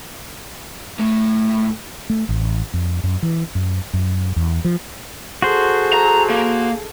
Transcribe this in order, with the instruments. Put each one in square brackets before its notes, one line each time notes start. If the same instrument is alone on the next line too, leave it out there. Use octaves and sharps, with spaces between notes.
[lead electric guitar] A2 A3
[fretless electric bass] A3
A1
F2
F#2
E3
F#2
F#2
E2
F3
[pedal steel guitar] F#4 C5 [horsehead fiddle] G#4 A4
[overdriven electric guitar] A#5
A#3